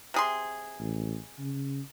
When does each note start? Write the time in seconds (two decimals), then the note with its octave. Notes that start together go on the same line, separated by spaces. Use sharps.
0.14 C3 G#4 C6
0.80 A1
1.39 C#3